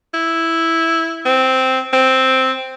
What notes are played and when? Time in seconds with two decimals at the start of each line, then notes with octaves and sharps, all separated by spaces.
0.14 E4
1.26 C4
1.93 C4